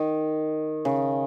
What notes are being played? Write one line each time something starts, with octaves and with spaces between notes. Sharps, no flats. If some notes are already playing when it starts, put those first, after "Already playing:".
Already playing: D#3
C#3